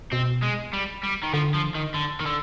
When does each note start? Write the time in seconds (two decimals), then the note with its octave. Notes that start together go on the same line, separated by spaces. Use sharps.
0.12 B2 C4
0.42 G#3
0.73 G3
1.03 G3
1.23 D#3
1.34 D3 F3
1.54 F3
1.75 D#3
1.95 D3
2.21 D#3
2.26 D3